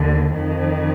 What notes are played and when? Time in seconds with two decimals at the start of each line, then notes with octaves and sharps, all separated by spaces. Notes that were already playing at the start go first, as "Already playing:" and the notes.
Already playing: D#2 D3
0.34 F2 D#3